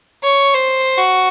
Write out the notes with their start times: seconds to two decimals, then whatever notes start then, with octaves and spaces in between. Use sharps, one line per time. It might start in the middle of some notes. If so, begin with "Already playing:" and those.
0.23 C#5
0.54 C5
0.98 F#4